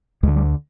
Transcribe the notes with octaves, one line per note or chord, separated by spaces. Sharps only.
D2 D3 G#3
G3